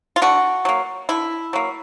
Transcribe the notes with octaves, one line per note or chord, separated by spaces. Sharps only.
F4
D3 F#4
F#3 A#3
D3 E4
F#3 A#3